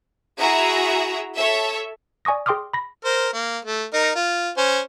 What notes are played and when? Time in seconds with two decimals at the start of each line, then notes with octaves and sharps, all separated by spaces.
0.39 E4 F#4 G#4 E5 A#5
1.34 A4 C#5 E5
2.25 D5 G#5 C#6 D#6 A#6
2.46 G#4 G5 C6 D6 D#6 F6
2.74 B5 A#6
3.05 A#4 C5
3.33 A#3
3.65 A3
3.94 D#4 A#4
4.15 F4
4.58 C#4 C5 G#5